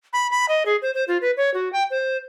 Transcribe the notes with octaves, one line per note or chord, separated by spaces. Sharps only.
B5
B5
D#5
G#4
C5
C5
F4
B4
C#5
F#4
G5
C5